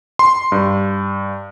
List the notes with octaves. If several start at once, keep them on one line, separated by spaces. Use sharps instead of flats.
C6
G2